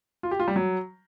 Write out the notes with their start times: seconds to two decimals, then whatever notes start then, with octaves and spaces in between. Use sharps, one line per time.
0.23 F4
0.31 G4
0.40 F4
0.48 G3
0.56 F#3